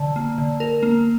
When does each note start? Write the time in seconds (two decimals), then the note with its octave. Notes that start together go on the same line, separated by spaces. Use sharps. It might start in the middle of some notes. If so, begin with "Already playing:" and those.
Already playing: D3
0.16 A#3
0.38 D3
0.60 A#4
0.83 A#3